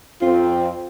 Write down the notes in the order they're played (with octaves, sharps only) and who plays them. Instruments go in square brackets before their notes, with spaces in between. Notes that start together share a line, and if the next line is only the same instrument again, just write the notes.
[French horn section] F2 C4 [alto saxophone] F4